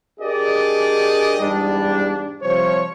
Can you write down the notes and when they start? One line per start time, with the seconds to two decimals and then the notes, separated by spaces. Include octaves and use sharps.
0.20 D4 G4 G#4 A#4 D5 D#5
1.40 E2 G#2 G3 D4
2.42 C3 F3 G3 C5 C#5